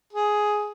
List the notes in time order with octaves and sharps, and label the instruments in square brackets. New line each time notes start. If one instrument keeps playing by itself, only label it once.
[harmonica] G#4